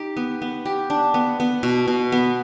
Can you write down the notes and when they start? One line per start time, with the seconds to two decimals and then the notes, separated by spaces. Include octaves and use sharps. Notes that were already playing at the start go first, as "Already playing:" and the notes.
Already playing: D#4 G4
0.17 B3
0.42 B3
0.65 G4
0.90 D4
1.14 B3
1.40 B3
1.63 B2
1.88 B2
2.12 B3